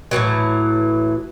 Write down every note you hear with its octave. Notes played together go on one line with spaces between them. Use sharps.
A2 D3 E3 F#3